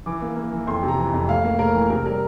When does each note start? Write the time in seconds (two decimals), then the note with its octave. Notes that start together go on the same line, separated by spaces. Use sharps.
0.06 E3 D6
0.22 A#3
0.37 A#3
0.52 E3
0.67 F2 C6
0.83 C3
0.88 A#5
0.98 E3
1.13 F2
1.28 A2 F5
1.45 A#3
1.59 A2 A#4
1.75 E3
1.90 C3 A#4
2.06 G3 A#4